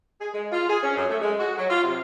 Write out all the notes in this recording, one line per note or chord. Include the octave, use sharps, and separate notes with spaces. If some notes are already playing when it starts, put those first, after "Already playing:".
G#4
G#3
F4
G#4
C#4
F#2
A3
G#3
F#4
F#3
F4
C3